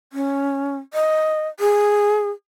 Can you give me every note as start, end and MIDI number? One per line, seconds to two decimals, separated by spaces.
0.13 0.77 61
0.94 1.48 75
1.60 2.30 68